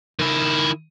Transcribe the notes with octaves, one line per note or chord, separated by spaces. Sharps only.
D#3 E4